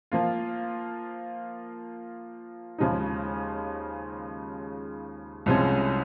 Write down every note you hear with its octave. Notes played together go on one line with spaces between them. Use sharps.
F3 A#3 F4
D#2 C#3 F3 G#3 D#4
C2 C3 F3 G#3 C#4